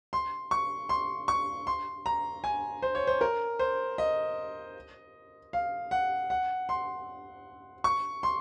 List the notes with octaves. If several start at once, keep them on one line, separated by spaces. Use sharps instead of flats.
C6
C#6
C6
C#6
C6
A#5
G#5
C5
C#5
C5
A#4
C5
D#5
F5
F#5
F#5
C6
C#6
C6